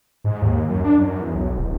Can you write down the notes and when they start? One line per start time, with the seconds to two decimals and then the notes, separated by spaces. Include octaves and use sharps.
0.24 G#2
0.42 D#2
0.69 F#2
0.84 D4
0.98 F#2
1.21 E2
1.35 B1
1.57 D1